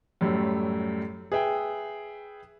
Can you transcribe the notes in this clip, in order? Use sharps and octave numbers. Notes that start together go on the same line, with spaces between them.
F#2 A2 G3 A3
G#4 B4 E5 G5